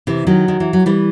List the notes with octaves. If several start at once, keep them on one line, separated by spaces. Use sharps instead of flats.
C3 E3
D#3 F#3
D#3
E3
F#3
E3 G3